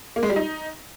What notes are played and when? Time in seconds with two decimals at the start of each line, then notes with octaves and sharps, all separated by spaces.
0.16 A#3
0.23 G#3
0.29 G3
0.36 D#4